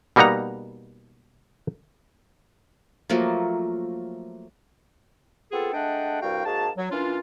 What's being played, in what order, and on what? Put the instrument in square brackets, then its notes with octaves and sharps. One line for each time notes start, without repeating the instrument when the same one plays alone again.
[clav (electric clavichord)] B2 G3 A#3 D#4 F#5 A#5
[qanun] F3 F#3 A3 A#3
[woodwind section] B3 C4 F4 G#4 A4
G#3 A3 D4 D#5 F#5 G5
C2 G2 F#4 F5 G5
G#2 A#3 F#4 G#4 A5
F#3
E3 A#3 C#4 D4 F4